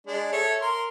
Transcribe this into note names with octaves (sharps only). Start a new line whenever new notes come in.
G#3 D4
A4 C#5 E5
A#4 C6